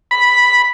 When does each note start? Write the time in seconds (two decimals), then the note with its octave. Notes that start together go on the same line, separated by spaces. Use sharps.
0.11 B5